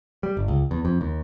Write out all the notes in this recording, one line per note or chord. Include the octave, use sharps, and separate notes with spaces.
G3
G1
C#2
E2
F2
D#2